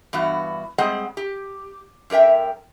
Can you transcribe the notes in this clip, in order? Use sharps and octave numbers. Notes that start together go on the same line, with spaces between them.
G2 E3 B3 F#4
G3 G#3 C4 G#4 D#5 F#5
G4
F#2 G4 A#4 E5 G5